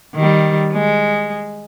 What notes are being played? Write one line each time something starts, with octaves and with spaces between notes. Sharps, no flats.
D#3 G3
G#3